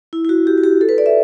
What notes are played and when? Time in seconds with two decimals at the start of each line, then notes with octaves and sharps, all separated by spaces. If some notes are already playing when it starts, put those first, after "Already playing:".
0.13 E4
0.25 E4
0.29 F#4
0.47 G4
0.58 F#4
0.64 G4
0.81 A4
0.89 B4
0.98 D5
1.06 E5